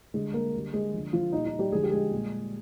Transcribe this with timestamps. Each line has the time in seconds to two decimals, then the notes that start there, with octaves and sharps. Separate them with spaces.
0.14 D3 G3 G#3 G#4
0.34 A#3 A#4
0.54 D3 G3
0.73 G#3 G#4
0.94 D3 F3
1.13 F3 F4
1.32 A#2 G3 D#4
1.46 D#4
1.59 G3 G4
1.72 D3 F3 G#3 G#4
1.83 G4
1.92 G#3 G#4
2.11 A#2 G3